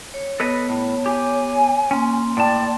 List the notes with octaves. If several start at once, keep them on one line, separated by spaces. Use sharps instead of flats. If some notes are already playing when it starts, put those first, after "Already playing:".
C#5
B3 A4 B4 C#5 D#5
A2
G4 G#5
A#3 C#4 C6
A2 D5 G5 A5